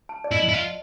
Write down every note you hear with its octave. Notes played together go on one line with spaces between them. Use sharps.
A5
D5
E4 D#5
E4
F4